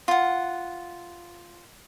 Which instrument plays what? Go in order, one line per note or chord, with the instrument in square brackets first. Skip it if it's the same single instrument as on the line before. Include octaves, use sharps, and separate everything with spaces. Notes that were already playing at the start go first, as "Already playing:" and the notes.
[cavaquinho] F4 F#5